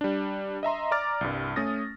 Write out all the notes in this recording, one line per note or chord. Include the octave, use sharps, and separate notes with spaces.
G3 D4
D#5 E5 A#5 C6
D5 A#5 D6 F6 A6
C2 G2
A3 C#4 D#6 A6 A#6